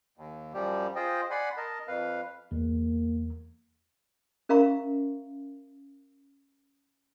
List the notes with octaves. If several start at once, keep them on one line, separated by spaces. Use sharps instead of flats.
D#2
F#2 F3 G3 G4
F4 G#4 C5 D#5 G5
D5 F#5 G#5 B5 C6
A#4 D#5 A5
F2 B4 F5
E2 A#3
C#4 A#4 E5 F5 A#5 C#6